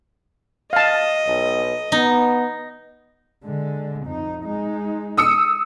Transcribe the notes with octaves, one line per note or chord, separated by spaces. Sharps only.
D#5 F5 A5
B1
B3 D#4
D3 G#3
F2 D#4
G#3 D#4
D#6 E6 C#7